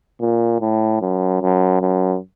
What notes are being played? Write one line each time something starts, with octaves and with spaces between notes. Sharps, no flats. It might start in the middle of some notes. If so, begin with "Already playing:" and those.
A#2
A2
F#2
F#2
F#2